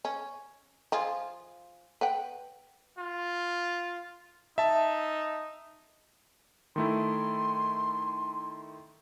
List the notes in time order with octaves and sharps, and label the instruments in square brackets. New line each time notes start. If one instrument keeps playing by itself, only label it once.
[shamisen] C#4
F3 F4 G#4
B4 F#5 G5
[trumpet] F4
[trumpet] D#4 [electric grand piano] E5 A5
[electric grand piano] D#3 A3 E4 [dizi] C6